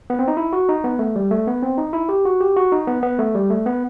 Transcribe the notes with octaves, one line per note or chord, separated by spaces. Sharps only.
B3
C4
D#4
E4
F#4
D#4
B3
A3
G3
A3
B3
C4
D#4
E4
G4
F#4
G4
F#4
D#4
B3
B3
A3
G3
A3
B3